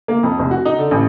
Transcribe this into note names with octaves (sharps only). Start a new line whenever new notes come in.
A#3
F2
F1
F#4
D#4
D3
A1